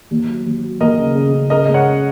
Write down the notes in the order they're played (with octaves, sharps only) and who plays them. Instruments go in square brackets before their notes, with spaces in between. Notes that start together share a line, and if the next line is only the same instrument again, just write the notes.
[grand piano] D#2
F#3
D#2
F#3
[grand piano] D#2 [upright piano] A#4 D#5
[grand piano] C#3
C#3
C#3
[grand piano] C#3 [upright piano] A#4 D#5
[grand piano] C#2 [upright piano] D#5
[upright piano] C#5 F#5
[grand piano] C#4